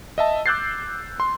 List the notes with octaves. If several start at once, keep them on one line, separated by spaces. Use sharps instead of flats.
D#5 E5 A5
D6 E6 F#6 G6 A6 C7
C6